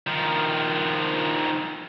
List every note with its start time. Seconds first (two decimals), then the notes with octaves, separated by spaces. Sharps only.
0.07 D#3 F3